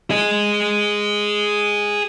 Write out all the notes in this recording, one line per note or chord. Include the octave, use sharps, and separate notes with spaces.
G#4 D#5